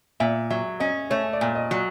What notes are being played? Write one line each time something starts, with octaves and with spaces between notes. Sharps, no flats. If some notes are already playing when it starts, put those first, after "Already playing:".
A#2 E5
F#3 E5
C#4 D#5
A3 C#5
D5
A#2
D#5
F#3